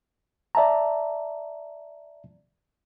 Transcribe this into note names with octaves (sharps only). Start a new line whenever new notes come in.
D5 E5 A5 A#5